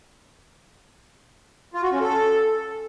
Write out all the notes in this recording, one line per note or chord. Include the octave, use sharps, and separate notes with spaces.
F4
F#4
C#4
A4